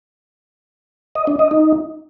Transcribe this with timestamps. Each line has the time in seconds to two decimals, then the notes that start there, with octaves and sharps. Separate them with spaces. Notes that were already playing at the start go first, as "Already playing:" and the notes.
1.15 D#5
1.27 D4
1.39 D#5
1.51 D#4